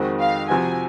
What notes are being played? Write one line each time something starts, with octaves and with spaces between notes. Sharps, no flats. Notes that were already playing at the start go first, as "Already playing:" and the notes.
Already playing: F2 D#3 G#3 C4 F#4
F5
C3 F3 C4 F#4 G#5